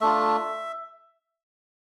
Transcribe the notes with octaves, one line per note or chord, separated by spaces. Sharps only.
A3 D4 F4 E5